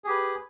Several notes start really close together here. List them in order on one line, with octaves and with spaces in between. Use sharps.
G#4 G4 B4